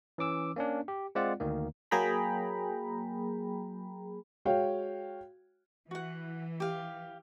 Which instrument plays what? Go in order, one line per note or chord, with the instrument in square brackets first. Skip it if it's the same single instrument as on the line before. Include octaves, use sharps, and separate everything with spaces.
[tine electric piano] E3 C#4 D6 E6
A#3 C#4 D4
G4
G#3 C4 F4 D5 F#5
D2 D#3 A#3
[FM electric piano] F#3 A#3 G#4 G5 A#5 B5
[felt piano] G#3 F#4 C#5 F5 G5
[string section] E3 [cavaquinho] F#4 F#5
[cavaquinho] G4 F5